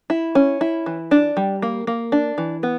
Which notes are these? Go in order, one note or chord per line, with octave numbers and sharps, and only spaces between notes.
E4
C#4
E4
E3
D4
G3
A#3
A#3
D4
E3
B3